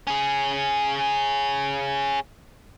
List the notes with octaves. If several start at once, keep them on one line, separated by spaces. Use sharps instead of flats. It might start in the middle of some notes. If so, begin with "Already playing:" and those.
C#4 G#4